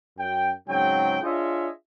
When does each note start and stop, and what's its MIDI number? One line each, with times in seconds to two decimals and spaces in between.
0.18 0.51 42
0.18 0.51 79
0.68 1.18 44
0.68 1.18 49
0.68 1.18 54
0.68 1.18 60
0.68 1.18 79
1.22 1.69 62
1.22 1.69 65
1.22 1.69 68
1.22 1.69 73
1.22 1.69 75
1.22 1.69 76